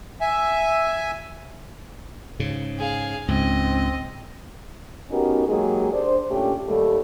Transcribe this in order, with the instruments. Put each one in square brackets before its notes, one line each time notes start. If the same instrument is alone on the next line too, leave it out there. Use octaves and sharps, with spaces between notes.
[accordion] E5 G#5
[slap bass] G#2 C#3
[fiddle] G#4 F5
[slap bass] C#2 G#2 [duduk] C4 [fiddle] D#5
[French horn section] B3 C#4 D#4 F#4 G4 A#4
F#3 G#3 A#3 D#4 G4 G#4
D4 C5
A#2 A3 C#4 D4 G4
D#2 G3 A3